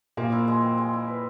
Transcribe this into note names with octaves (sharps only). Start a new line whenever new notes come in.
A#2 F3 A#3
E4
G#3
C4
G#3
E4
B4